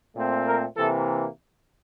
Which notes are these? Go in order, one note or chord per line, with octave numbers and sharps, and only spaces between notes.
A#2 A3 C4
A#4
C3 E3 A#3 A4